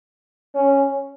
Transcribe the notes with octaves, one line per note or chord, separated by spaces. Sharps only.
C#4